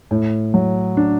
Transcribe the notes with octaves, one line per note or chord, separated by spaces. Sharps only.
A2
F#3
D4